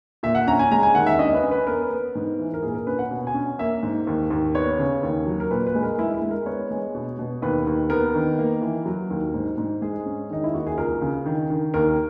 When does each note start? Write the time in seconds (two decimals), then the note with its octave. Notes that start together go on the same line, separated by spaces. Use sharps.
0.23 A#2 E5
0.35 F#5
0.47 C#4 A#5
0.59 G#5
0.71 G#3 A#5
0.83 G#5
0.95 D#2 F#5
1.07 E5
1.19 C#4 D#5
1.34 B4
1.43 C#4
1.51 B4
1.67 B3 A#4
1.90 B3
2.15 G#2
2.39 E3
2.54 A#4
2.63 A#2 G#4
2.75 A#4
2.87 C#4 B4
2.99 F#5
3.11 B2
3.27 G#5
3.34 C#4
3.59 A#3 E5
3.83 G#2
4.07 D#2
4.30 D#2
4.55 B3 C#5
4.79 C#3
5.03 D#2
5.27 F#3
5.40 A#4
5.51 A#2 B4
5.67 B4
5.75 G#3
5.83 A#4
5.98 G#3 E4
6.15 E4
6.22 G#3
6.31 A#4
6.46 B3 C#5
6.71 G#3
6.95 B2
7.19 B2
7.42 D#2 B4
7.67 D#2
7.90 B3 A#4
8.14 D#3
8.39 A#3
8.62 E3
8.86 F#3
9.10 D#2
9.34 G#2
9.58 G#2
9.82 G#3 G#4
10.06 C#4
10.30 D#3 D#4
10.44 E4
10.53 D#2 F#4
10.67 G#4
10.77 C#2 A#4
11.02 C#3
11.26 D#3
11.50 D#3
11.74 D#2 A#4